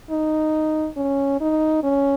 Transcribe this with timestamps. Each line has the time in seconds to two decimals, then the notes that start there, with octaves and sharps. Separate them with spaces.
0.11 D#4
0.97 C#4
1.41 D#4
1.84 C#4